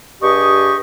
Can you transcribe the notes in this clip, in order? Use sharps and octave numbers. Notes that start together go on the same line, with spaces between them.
G2 G4 G#4 D#5 C#6